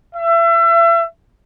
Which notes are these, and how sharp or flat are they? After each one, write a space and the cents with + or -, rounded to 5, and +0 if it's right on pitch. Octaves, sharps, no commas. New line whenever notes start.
E5 +35